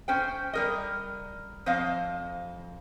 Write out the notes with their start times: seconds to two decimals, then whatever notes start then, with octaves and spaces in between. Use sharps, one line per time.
0.08 C#4 C5 G5
0.53 G3 A#4 D#5
1.66 F2 C5 D#5 F5